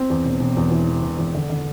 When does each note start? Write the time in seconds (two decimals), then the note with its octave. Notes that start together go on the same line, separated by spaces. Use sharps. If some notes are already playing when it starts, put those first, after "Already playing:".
Already playing: C4
0.10 E2
0.25 E1
0.40 E1
0.57 E2
0.71 E3
0.87 E1
1.02 E1
1.18 E2
1.34 D3
1.50 D3